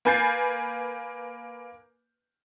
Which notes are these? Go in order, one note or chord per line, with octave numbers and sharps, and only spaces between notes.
A#3 B4 G#5 G6 A6 C7